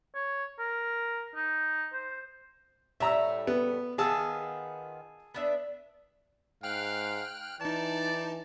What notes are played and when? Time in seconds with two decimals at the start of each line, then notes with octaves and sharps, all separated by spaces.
0.15 C#5
0.59 A#4
1.35 D#4
1.93 C5
3.00 A2 G3 A3 E5 A#5 E6
3.47 B3
3.98 D#3 B3 F4 G#4 A5 E6
5.34 B3 D4 E5
6.63 G#2 F5 G5 F6 F#6
7.61 E3 D#4 D5 A5